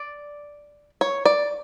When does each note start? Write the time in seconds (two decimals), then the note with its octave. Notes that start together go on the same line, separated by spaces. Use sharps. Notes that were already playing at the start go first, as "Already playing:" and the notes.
Already playing: D5
1.01 C#5
1.25 D5